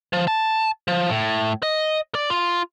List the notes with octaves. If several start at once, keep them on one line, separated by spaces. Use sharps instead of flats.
F3
A5
F3
A2
D#5
D5
F4